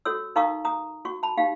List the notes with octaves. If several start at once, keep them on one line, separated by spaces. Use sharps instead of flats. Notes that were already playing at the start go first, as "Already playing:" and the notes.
F#4 A4 C#5 E6
D#4 A#4 F5 A#5 C#6 D#6
A#5 D#6
F#4 C#6
A5 B5
D#4 G4 F5